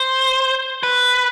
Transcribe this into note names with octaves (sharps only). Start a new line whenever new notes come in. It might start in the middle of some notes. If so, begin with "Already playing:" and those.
Already playing: C5
B4